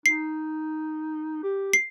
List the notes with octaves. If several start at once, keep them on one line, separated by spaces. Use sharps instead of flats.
D#4 C7
G4
C7